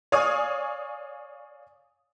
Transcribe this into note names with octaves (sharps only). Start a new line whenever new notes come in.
C#5 D5 F5 G#5 C#6 D#6